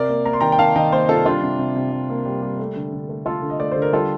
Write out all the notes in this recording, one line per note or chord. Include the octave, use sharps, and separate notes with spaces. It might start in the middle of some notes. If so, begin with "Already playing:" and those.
Already playing: C3 A#4 D5
A#3
A#3 A#5
C6
D#3 G5 A#5
G5
D#3 F5 A5
D#3 D#5 G5
A#3 C5 D#5
C3 F4 A4
G3 D4 F4
C3
C3
C3
C3
A#3
G3
G3
A3
D3
D3
A3
A3 F4 A4
D3
D#5
A3 D5
D3 C5
A#4
G3 F4 A4